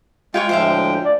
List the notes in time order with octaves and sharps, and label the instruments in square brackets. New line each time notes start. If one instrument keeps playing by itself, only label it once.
[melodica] G#3 G5 [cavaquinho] F4 C#5 C#6
[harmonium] D2 A2 F3 [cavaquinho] C5 E5 F5
[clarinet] D5